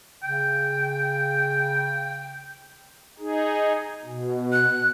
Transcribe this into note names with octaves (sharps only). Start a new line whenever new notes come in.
C#3 G5
D#4 G#4
B2
F#6